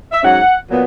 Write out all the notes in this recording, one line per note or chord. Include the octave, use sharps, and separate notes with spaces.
E5
G#2 F#3 C#4 F#5
A#2 F#3 B3